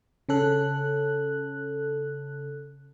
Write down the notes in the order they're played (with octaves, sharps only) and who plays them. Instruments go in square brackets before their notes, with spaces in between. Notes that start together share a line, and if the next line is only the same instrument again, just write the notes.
[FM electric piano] C#3 C#4 A4 F#6